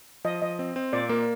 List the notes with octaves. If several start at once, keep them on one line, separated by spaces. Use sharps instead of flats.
F3 D#5
F3 D#5
C4
C4
A#2 D5
A#3 A#4